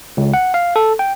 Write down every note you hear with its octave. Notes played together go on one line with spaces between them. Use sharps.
C#2
F#5
F5
A4
G5